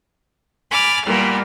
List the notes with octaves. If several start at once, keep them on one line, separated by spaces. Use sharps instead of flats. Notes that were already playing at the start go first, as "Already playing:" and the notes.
G#5 B5 D6 F6 A6
A#2 E3 G3 A#3 B3